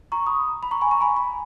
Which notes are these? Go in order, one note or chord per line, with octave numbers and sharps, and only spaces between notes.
A#5 C#6
B5 D#6
B5
A#5 C#6
G#5 B5
A#5 C#6
G#5 B5
G#5 B5